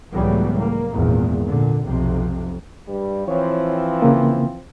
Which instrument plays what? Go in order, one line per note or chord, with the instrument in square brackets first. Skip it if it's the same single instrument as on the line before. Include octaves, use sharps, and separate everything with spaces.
[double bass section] C#2 A2 E3 F#3 G3 B3
A#3
G#1 E2 A#2
A#2 D3
B1 F2 C3
[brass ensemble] G2 G3
[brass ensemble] E3 F3 C4 [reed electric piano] C#5
[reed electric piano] C#3 A#3